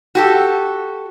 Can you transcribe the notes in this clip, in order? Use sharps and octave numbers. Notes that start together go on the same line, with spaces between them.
F#4 G4 A4